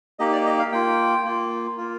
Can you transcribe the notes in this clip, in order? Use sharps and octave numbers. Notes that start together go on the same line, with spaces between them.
A#3 D#4 G4 D#5
D5
D#5
F5
A#3 F4 G5
A#3 F4
A#3 F4